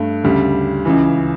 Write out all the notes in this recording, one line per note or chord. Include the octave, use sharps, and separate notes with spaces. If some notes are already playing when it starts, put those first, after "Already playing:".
Already playing: G2 A3
D2 C#3 G3
C#2 C#3 E3